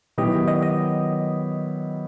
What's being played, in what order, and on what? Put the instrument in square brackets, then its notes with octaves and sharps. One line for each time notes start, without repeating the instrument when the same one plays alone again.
[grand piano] D#3 F#3 B3 E4 G4 [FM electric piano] D#5
[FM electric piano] D#5
D#5